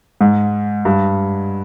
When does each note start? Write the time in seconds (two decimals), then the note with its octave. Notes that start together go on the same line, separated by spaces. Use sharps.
0.21 G#2
0.85 G2